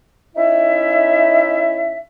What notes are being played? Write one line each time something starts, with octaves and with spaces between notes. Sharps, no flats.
C#4 D#4 E4 E5